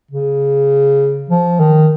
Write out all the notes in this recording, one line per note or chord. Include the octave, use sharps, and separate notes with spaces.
C#3
F3
D#3